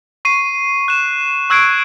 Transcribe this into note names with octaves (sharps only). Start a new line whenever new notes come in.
C#6 C7 D#7
F#6 E7
C#6 E6 F#6 G#6 C7 D7